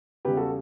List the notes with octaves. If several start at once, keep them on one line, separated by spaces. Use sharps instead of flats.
E2 C#3 G3 G4 B4
F#4 A4